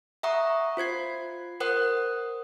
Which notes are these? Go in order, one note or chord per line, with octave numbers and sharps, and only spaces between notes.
E5 F#5 A#5 C#6 D#6
F4 C5 G#6 C7
A#4 C5 F#5 D#6 F#6